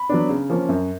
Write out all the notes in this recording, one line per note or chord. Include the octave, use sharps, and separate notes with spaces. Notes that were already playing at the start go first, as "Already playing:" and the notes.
Already playing: B5
F#3 B3 D4
C#3
F3 A#3 C#4
F#2